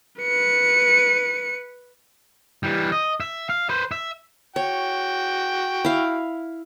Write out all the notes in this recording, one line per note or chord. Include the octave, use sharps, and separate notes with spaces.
B4 C#7
E3 G3
D#5
E5
F5
B4 C5
E5
F#4 C#5 G5
E4 F5